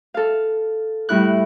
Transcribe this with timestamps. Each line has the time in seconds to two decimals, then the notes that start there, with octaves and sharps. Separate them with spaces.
0.14 A4 F5
1.09 A2 G3 E4 F#6